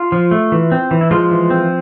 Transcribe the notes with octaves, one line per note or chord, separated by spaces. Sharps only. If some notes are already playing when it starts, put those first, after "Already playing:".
Already playing: F4
F3
A3
E3
C4
E3
E4
F3 G#3 F4
E3
C4